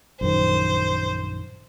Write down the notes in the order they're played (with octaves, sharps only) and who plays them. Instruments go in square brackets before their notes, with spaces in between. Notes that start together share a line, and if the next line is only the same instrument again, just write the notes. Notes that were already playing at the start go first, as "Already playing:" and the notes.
[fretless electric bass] A#1 F#2 D#3 [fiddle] C5